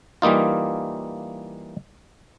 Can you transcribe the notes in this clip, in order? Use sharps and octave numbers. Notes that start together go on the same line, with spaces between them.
E3 G3 A#3 D#4 F4